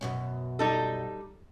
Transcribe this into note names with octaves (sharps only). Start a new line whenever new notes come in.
F#2 B2 C#4
G3 D#4 A4